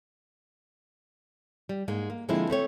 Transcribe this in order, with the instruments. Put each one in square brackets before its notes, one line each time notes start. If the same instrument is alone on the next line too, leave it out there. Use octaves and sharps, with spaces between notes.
[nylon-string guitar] G3
G#2 G#3 A#3
A#3
D3 F3 G#3 A#3 C4 E4
A3 C4 C#5